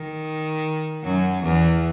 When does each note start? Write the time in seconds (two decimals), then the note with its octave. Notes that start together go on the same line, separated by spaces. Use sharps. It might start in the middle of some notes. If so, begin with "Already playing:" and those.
Already playing: D#3
1.03 F#2 F#3
1.43 E2 E3